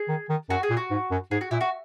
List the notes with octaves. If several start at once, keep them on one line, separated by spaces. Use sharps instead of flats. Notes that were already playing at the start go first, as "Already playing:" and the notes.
Already playing: G#4
D#3
D#3
F#2 F#4
G#4
A#2
F#4
G#2
F#2
G#2 G#4
F#4
A#2 E4
F#4